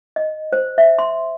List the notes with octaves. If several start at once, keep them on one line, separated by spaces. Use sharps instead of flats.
D#5
C5
E5
C6